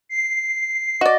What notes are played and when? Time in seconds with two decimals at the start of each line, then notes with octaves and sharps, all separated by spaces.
0.09 C7
1.01 F#4 D5 D#5